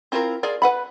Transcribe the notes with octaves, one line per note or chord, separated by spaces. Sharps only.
C4 E4 F4 A4 A#4
F4 G#4 A#4 D5
B4 F#5 B5